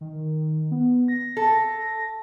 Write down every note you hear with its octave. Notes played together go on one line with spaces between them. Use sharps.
D#3
B3
A#6
A4